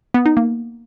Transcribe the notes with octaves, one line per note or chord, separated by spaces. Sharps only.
B3
D#4
A#3